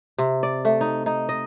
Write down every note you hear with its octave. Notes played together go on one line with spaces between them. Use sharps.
C3
D5
A3
D#4
D#4
D#5